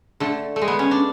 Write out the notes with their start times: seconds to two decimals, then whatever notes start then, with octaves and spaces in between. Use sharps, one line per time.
0.20 D3 A3
0.56 A3
0.62 G#3
0.68 B3
0.79 C#4
0.91 D4